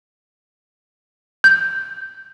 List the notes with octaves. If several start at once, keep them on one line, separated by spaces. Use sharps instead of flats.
G6